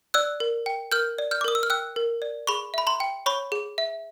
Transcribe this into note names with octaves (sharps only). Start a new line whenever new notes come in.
D5 E6 F#6
A#4
G5
A#4 F6 G6
D5
F6 G6
D6
A#4 D#6
E6
F6
G5 E6 F#6
A#4
D5
G#4 B5 C#6
E5 B5
A#5 C6
G5
C#5 B5 C#6
G#4
E5